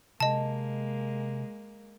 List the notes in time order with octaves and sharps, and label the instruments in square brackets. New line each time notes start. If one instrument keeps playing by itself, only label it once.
[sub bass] C3 [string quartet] G#3 A#3 [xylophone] D#5 A5